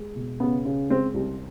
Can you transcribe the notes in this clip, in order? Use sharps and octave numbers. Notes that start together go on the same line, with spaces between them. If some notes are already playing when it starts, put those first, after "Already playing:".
Already playing: G#3
B2
C#3 B3
C#3
G#3 C4
C2